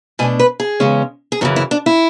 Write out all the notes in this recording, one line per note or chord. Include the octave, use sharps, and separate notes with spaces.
B2 A3 D4 G#5
B4
G#4
E2 C#3 G#3 C#4
G#4
F#2 C#3 E3 F#4
E4
D4
E4